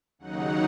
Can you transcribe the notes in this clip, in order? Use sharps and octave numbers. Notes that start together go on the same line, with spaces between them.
D#2 C#3 F#3 D#4 F#5